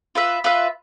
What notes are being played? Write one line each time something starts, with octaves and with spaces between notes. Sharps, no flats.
F4 B4 E5
F4 B4 E5